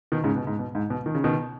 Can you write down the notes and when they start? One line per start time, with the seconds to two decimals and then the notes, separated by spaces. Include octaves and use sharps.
0.12 B2 D#3
0.24 G#2 C#3
0.36 B2
0.47 G#2
0.59 B2
0.75 G#2
0.90 B2
1.06 D#3
1.15 C#3
1.24 B2 D#3